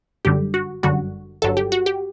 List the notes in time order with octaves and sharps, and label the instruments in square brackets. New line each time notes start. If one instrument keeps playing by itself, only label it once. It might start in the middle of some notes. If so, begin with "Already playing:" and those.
[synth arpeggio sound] G1 F#2 D3 G3 G4
F#4
G1 F#2 D3 G3 F#4
G1 G2 F#3 A4
G4
F#4
G4